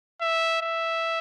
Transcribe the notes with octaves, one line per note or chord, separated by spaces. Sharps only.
E5
E5